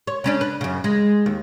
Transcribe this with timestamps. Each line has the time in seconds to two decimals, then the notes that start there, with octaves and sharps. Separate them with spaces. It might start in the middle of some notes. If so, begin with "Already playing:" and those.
0.07 C#5
0.24 C#3 C#4 D4
0.41 B4
0.61 F#2 C#3
0.84 G#3
1.26 D#2